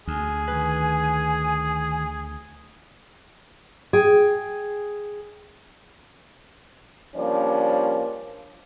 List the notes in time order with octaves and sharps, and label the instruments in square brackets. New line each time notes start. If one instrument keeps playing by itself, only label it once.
[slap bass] D2 [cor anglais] G#4 [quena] G#5
[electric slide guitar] D#3 B4
[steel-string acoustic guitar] G#4 G5
[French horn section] F3 G3 A#3 C#4 D4